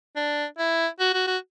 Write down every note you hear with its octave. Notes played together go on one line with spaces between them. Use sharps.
D4
E4
F#4
F#4
F#4